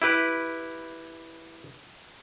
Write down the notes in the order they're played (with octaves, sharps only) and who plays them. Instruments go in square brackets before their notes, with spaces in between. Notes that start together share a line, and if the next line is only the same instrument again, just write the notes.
[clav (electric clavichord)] E4 G4 B4